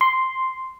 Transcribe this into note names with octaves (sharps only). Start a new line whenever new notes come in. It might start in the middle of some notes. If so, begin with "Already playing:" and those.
C6